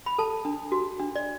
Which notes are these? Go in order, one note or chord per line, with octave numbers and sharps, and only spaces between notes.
B5
A4 A5
D4
F#4
D4
D5